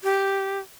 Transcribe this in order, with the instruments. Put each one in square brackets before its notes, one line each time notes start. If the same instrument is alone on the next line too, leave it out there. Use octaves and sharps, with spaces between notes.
[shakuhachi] G4